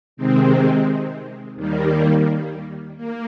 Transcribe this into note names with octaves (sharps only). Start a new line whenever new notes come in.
C3 D#3 G#3 C4
D#2 D#3 G3 A#3
A#3